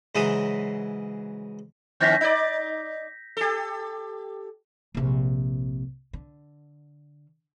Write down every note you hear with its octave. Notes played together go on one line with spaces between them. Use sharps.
G#2 C#3 E3 F#3 E5 D#6
D3 B3 C#4 G6 A#6 B6
D#4 D5
G4 A4
A#1 C3
D3